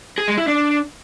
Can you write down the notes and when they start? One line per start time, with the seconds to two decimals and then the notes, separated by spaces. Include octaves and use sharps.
0.18 G#4
0.28 G#3
0.38 E4
0.48 D4